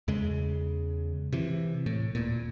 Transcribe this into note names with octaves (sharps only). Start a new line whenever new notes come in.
E2 C#3 G#3
C3 E3
A2
D#1 A#2